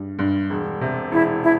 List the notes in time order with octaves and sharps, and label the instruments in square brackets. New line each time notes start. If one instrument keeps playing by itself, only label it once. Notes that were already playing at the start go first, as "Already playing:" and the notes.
Already playing: [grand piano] G2 G3
G2
E1
C3
[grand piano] E1 [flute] E4
[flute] E4